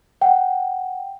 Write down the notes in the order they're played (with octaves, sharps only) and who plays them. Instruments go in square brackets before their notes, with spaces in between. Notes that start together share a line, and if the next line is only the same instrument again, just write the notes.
[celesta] F#5 G5